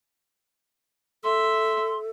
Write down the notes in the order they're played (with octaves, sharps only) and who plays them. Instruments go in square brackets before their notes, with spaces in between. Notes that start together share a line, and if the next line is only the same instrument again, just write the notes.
[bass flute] A4 [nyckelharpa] E5 [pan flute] C6